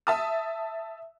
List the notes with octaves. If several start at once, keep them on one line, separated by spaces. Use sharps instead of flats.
E5 A5 D#6